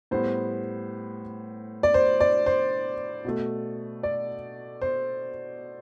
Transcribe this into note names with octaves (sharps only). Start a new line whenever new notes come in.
A2 G3 B3 C5
D5
C5
D5
C5
B2 A3
D5
C5